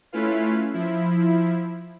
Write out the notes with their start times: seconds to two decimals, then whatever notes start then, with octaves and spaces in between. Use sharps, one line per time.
0.12 A3 C#4 E4 F4 B4 F5
0.74 F3 E4